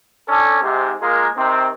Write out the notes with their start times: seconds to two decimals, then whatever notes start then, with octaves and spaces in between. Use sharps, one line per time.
0.28 C#4 D4 A4
0.62 G#2 C3
1.02 G#3 A#3 F4 G#4 A#4
1.37 C3 D#3 C4